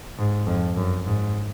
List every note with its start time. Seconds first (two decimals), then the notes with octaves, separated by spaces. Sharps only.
0.19 G#2
0.47 F2
0.76 F#2
1.06 G#2